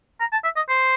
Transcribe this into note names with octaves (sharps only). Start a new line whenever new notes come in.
A#5
A5
E5
D#5
C5